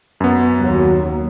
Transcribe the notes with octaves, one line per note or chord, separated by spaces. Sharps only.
F#2 B3
D#2 F#3 A#3